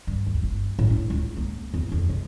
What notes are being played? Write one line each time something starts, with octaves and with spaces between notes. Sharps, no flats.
G2
D2
G1
A2
D4
C#2
A#3
E2
F2
C3